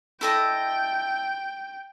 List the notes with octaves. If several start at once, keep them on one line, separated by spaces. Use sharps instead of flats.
E4 A4 D#5 G5